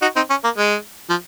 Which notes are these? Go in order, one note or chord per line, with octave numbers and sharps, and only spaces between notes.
D#4 F#4
C4 D#4
C#4
A#3
G#3
F3